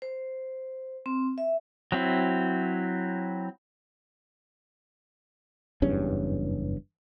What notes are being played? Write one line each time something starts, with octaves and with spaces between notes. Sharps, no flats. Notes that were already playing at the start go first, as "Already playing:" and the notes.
C5
C4
E5
F#3 C4 E4
F#1 E2 G2 C#4